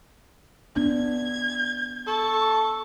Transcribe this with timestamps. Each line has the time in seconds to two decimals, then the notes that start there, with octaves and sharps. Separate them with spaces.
0.76 B3 D4 G#6
2.07 A4 C#6